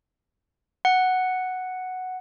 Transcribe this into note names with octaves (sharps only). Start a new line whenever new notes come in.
F#5